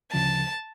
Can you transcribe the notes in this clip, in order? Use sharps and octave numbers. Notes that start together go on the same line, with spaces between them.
D2 C#3 F3 A5